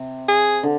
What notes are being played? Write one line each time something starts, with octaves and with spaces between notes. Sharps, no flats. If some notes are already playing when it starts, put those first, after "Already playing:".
Already playing: C3
G#4
D3